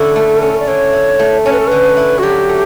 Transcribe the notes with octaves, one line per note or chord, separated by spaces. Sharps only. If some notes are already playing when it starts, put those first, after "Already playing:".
Already playing: D3 C#4 E4 A4
A3
C#4
D5
D3 C#5
E4
A3
C#4 C#5
B4
A4
D3 B4
E4
F#4
F#3 G4
A3